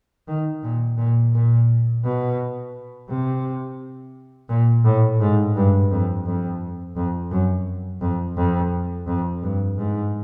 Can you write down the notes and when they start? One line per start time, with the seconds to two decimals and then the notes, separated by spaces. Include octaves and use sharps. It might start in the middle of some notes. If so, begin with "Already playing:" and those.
0.28 D#3
0.63 A#2
0.98 A#2
1.34 A#2
2.04 B2
3.09 C3
4.49 A#2
4.85 A2
5.20 G#2
5.56 G2
5.91 F2
6.26 F2
6.96 F2
7.31 F#2
8.01 F2
8.36 F2
9.07 F2
9.43 G2
9.78 G#2